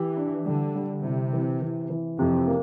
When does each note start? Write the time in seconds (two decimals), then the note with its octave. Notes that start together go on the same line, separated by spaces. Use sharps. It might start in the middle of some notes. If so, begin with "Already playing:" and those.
Already playing: E3 G4
0.17 D4
0.46 D3 G3
0.75 G3
1.03 C3 E4
1.33 E3
1.62 E3
1.90 E3
2.19 F2 C3
2.48 A#3